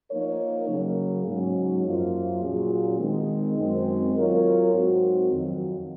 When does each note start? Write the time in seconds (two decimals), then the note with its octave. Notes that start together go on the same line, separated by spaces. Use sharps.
0.11 F3 A#3 D#4 A#4 C#5
0.68 C#3 F#3 A#3
1.26 G#2 F#3 C#4
1.84 F#2 F3 A#3 F4
2.42 A#2 F#3 C#4 F4 G#4
2.99 D#3 G#3 C4
3.57 F#2 D#3 G#3 C4 F#4
4.15 F#3 C4 F4 A#4 C#5
4.73 G#2 F#3 C4 F#4
5.31 F2 D#3 F#3